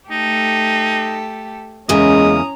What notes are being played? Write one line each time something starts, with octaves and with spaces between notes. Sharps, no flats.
A3 D#4 G4 A4
E2 C#3 G#3 A#3 C#4 A#5 D#6